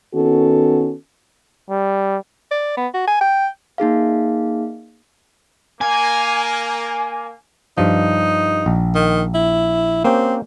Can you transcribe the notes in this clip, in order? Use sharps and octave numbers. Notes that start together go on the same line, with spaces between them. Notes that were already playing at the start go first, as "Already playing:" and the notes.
D#3 B3 C#4 F#4 A4
G3
D5
B3
F#4
G#5
G5
A#3 D#4 G#4 F5
A#3 G#5
G2 F3 D#4
A#1
D#3
E4
A#3 C4 C#4 G4